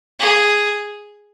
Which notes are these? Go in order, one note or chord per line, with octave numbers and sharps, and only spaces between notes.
G#4